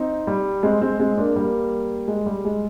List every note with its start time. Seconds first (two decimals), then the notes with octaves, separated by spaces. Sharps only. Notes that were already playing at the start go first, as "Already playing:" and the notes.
Already playing: C4 D#4
0.27 G3
0.63 G#3 C4
0.81 G#3 C4
1.00 G#3 C4
1.17 A#3 D4
1.36 G3 A#3
2.08 G#3
2.26 G3
2.45 G#3